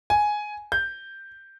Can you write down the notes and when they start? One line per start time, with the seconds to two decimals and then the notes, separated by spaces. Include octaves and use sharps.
0.10 G#5
0.72 G6